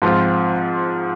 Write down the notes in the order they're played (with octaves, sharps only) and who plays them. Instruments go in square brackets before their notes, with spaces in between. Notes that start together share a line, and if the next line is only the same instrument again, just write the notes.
[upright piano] G#2 F3 C4 F4